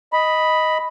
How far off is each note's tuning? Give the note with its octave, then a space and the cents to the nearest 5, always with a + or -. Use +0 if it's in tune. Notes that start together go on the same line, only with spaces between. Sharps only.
D#5 +5 B5 +0